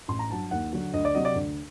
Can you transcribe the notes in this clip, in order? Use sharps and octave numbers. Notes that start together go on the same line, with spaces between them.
A1 C6
A#5
G2 F#3 A5
D#2 F#5
D3 F#3
D2 D#5
D5
C3 F#3 D#5
D5
D2